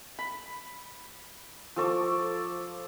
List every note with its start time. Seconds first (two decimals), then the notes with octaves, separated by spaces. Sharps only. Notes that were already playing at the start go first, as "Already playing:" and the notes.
0.19 B5
1.76 F3 A4 C#6 D6